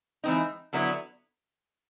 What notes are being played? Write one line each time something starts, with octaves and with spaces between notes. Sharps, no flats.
E3 G#3 C4 D#4
D3 F#3 B3 E4